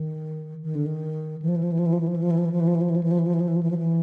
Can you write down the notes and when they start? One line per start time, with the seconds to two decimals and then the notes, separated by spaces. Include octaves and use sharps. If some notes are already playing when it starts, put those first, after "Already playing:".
Already playing: D#3
0.63 D#3
0.75 D3
0.86 D#3
1.42 E3
1.48 F3
1.56 E3
1.63 F3
1.72 E3
1.79 F3
1.86 E3
1.93 F3
2.00 E3
2.08 F3
2.16 E3
2.22 F3
2.31 E3
2.38 F3
2.45 E3
2.52 F3
2.60 E3
2.67 F3
2.75 E3
2.81 F3
2.90 E3
2.96 F3
3.03 E3
3.11 F3
3.19 E3
3.26 F3
3.34 E3
3.40 F3
3.48 E3
3.56 F3
3.63 E3
3.71 F3
3.78 E3